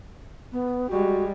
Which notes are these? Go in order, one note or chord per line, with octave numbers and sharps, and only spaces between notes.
B3
G3 G#3 F#4